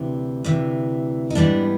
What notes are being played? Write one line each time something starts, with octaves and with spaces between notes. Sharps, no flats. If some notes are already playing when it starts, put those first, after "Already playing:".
Already playing: D2 C3 E3
D2 C3 E3
D#4
G#2 E3 G3 B3 D4